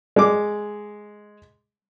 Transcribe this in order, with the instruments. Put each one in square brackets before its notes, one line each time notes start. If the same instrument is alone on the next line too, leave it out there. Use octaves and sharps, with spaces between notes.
[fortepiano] G#3 D6